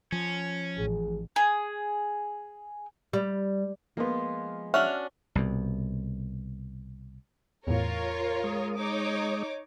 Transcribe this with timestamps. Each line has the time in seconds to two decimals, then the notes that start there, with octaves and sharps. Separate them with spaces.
0.12 F3 C#4
0.78 A1 G#4
1.36 G#4
3.13 G3
3.97 F3 G#3 A#3 B3 F4
4.74 C#4 D4 F#4 E5 F6
5.35 C2 B2
7.67 E2 A2 F4 A#4 C#5
8.09 C6
8.44 G#3 D#6
8.77 D#4 C#5 D6